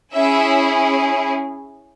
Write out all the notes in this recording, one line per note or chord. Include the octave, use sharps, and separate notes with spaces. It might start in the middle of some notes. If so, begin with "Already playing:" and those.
C#4 E4 G#4 E5